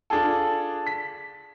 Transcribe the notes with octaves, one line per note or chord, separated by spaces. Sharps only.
D4 F4 G#4 A4
B6